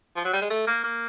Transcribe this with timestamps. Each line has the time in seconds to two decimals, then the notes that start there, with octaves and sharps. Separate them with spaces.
0.16 F3
0.25 F#3
0.33 G3
0.42 G#3
0.50 A3
0.67 A#3
0.84 A#3